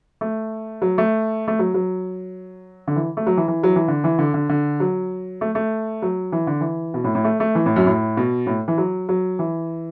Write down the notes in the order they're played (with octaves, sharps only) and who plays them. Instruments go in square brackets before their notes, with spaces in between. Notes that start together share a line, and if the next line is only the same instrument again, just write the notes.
[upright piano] A3
F#3
A3
A3
F#3
F#3
D3
E3
A3
F#3
E3
E3
F#3
E3
D3
E3
D3
D3
D3
F#3
A3
A3
F#3
E3
D3
E3
B2
A2
A2
A3
A3
E3
A2
F#2
A2
B2
A2
E3
F#3
F#3
E3